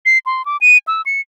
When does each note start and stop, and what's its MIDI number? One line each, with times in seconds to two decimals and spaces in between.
0.06 0.18 96
0.26 0.42 84
0.46 0.57 86
0.61 0.78 99
0.88 1.02 88
1.06 1.21 97